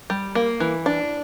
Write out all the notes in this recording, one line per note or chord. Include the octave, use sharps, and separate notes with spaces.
G3
A#3
E3
D4